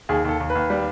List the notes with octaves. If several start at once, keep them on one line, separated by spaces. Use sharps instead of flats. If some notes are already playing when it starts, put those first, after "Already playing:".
D#2 G#4
D#2 A4
D#2
B4
D#2
G3